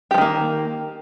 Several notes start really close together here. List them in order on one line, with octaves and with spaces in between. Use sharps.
G4 F3 D#3 A#3